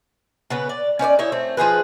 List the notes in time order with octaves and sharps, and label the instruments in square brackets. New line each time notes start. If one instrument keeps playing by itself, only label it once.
[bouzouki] C#3 B3 B4
D5
C#4 D#4 C5 D5
D#4 E4 C#5 E5
A3 C4
F3 D#4 G#4 B4